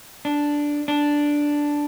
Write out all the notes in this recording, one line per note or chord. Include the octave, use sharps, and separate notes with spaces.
D4
D4